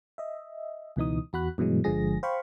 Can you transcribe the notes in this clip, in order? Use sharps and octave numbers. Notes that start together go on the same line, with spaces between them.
D#5 E5
C#2 B2 E3 D#4 D#6
E2 F#4 B5 F#6
G2 B2 E3 F#3 G#3
G1 D3 F3 G#3 G#4 A#6
C5 F5 G5 B5 C#6